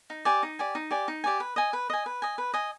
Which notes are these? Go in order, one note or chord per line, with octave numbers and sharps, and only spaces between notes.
D#4
G4 D5 G#5
D#4
G4 D5 G#5
D#4
G4 D5 G#5
D#4
G4 D5 G#5
B4
D#5 G#5
B4
D#5 G#5
B4
D#5 G#5
B4
D#5 G#5